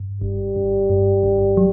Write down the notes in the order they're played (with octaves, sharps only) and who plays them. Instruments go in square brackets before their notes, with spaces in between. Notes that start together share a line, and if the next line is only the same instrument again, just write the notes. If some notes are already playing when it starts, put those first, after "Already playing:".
Already playing: [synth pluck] G2
[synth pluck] G1 [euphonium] G3
[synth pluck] G1
G2
G1
F#3